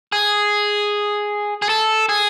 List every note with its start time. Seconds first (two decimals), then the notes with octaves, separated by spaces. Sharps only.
0.12 G#4
1.62 G#4
1.69 A4
2.09 G#4